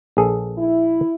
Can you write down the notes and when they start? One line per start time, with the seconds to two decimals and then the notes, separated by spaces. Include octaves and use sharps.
0.17 A#1 G#4 A4
0.57 E4